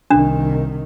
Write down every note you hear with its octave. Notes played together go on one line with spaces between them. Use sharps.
C2 D#3 D4